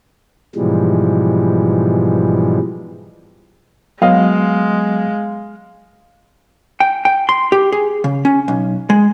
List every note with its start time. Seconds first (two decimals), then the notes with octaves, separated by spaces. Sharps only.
0.56 G#2 B2 E3 F3 G3 G#3
4.02 F#3 G#3 B3 D#5 F5
6.80 G5
7.05 G5
7.29 C6
7.52 G4
7.72 G#4
8.04 C#3
8.25 C#4
8.48 B1
8.90 G#3